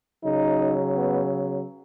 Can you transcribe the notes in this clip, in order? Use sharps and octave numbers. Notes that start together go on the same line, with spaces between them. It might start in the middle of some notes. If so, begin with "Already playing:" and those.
C#3 F#3 D#4
B3